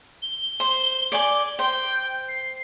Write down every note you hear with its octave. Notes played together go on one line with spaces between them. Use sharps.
G7
C5
D5 G#5 D6
C5 G5
C7